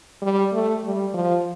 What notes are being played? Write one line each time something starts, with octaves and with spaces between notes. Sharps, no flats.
G3
A3
G3
F3